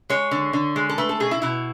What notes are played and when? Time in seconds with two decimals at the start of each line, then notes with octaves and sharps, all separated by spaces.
0.10 G#3 C#5
0.31 D3
0.53 D3
0.76 G#3
0.89 A4
0.98 A3 B4
1.09 A4
1.20 B2 G#4
1.31 E4
1.42 B2 E4